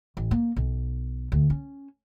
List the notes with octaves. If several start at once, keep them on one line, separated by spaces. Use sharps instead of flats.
A1
A#3
B1
D2
C#4